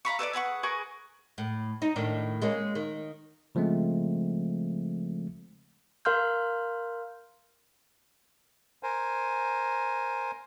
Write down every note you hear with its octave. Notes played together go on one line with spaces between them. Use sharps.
F5 A#5 B5 C#6
A4 B4 C#5 D5
G#4 B4 F#5 C#6
G#4 A#4 B4 C#6
A2
D#4
A2 D#3 D4
G#3 A#3 C#4
D#3
C#3 F3 G#3 A3 C4
A#4 F5 C6 F6 G6
A#4 C5 G#5